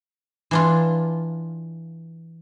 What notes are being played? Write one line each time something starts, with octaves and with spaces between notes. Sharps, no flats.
E3 D4 F4